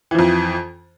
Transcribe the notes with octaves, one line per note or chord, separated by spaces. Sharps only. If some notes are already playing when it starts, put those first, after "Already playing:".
F2 E3 F3